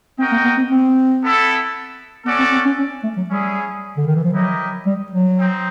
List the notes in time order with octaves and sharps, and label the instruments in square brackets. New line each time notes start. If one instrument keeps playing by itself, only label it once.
[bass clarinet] C4 [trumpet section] F#4 A#4 D#5 G5
[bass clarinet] A#3
B3
C4
C4
[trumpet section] B3 E4 A4
[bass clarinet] B3 [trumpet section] C#4 F#4 A4 D5
[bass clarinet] C4
C4
C#4
C#4
A3
F#3
[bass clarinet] G3 [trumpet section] C#4 E4 G#4
[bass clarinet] D3
D#3
E3
F3
[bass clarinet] F#3 [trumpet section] E4 G4 A#4 D#5
[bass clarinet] G3
F#3
[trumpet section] C4 D#4